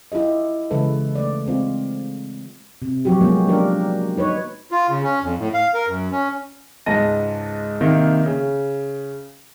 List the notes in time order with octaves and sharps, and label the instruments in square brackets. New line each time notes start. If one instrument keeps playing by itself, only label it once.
[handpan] E4 F4 G4 D#5
C#3 E3 G#3 A4 B4 E5
A3 D5
G#3 C4 F4
C3
F3 F#3 F#4 G4
G#3 A#3 B3 C#4
A#3 D4 G4 A#4
D#4 B4 C#5
[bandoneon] F4
C#3
C#4
F2
A2
F5
A#4
F#2
C#4
[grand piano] C#2 G#2 D#5 A5 A#6 D#7
C3 D#3 A#3
C#3